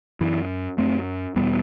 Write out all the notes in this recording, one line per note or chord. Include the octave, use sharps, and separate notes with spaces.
F#2 E3
F#2 A3 C4
E2 B2 G3 B3